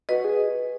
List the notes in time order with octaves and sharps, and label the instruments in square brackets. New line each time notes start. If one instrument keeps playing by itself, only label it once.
[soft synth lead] F#4 [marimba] B4 D#5
[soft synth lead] G#4